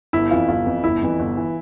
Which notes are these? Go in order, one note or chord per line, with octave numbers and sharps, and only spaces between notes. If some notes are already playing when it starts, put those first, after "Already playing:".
G1 E4
F2 E3 F4
G1 F4
F2 E3
G1 E4
F2 E3
G1
E3